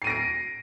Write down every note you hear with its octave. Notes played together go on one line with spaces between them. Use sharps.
A#6 C7 D7 D#7